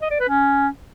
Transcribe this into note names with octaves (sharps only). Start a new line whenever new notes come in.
D#5
D5
B4
C#4